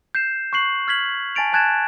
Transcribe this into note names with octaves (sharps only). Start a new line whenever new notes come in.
G6 C7 E7
C#6 F#6 C7 F#7
F6 G#6 B6 F#7
G#5 A5 A6 D7 F7
G#5 A5 F#6 G#6 A6 E7